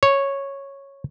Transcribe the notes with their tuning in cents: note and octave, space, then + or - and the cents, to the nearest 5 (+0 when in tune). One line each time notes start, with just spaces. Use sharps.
C#5 -5